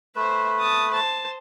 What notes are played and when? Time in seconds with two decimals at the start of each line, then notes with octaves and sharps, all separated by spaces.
0.16 A3 B4 C5 E5
0.59 A5 D#6
0.91 C5 A5